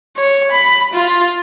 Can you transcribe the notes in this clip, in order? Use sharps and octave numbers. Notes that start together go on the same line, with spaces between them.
C#5
B5
F4